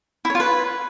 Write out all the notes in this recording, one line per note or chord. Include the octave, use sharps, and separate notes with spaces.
E4
C#5
F4
B4